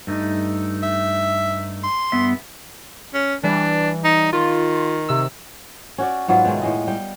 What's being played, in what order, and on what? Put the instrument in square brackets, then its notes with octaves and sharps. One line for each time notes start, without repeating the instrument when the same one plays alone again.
[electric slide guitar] G2 A3 D#4
[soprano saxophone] E5
C6
[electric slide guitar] G2 B3 E5
[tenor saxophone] C#4
[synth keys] E3 G3 [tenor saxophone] D4
[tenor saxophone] D#4
[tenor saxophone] D#3 [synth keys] F4
[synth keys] C3 E6
[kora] C#4 F#4 D5
G#2 F#3 B3 F4
B2 D#3 G#3 A3
A2 G#3 D#5
G3 G5